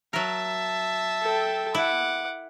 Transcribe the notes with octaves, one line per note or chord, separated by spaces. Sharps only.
F#3 A#4 E5 A5
A4 G5
E4 F#5 D6